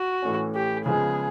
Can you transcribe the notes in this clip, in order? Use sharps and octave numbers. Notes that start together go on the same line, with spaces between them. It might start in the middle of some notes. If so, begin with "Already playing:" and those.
Already playing: F#4
A2 E3 A3 C#4
G4
C#3 F3 G#3 B3 G#4